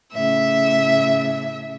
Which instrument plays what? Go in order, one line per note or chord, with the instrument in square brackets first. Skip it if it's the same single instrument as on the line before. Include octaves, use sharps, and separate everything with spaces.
[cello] A2 C#3 [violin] E5